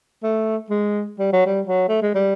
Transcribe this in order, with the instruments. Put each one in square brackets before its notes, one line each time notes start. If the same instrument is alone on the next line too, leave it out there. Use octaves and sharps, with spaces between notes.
[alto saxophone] A3
G#3
G3
F#3
G3
F#3
A3
G#3
G3